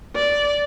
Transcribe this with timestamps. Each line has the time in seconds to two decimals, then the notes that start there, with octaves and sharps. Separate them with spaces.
0.15 D5